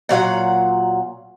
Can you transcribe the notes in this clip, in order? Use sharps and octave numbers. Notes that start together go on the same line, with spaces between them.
A#2 F#3 F5 F#5